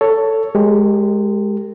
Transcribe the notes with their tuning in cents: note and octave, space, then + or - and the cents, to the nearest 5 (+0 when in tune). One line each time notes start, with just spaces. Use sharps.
A4 +10 C#5 +10
G#3 +0 G4 +0 A#4 -40